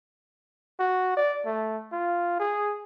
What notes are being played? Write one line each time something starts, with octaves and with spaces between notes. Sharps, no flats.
F#4
D5
A3
F4
G#4